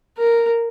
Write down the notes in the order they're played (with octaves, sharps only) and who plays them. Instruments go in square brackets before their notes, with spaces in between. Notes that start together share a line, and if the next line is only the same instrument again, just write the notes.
[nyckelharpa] A#4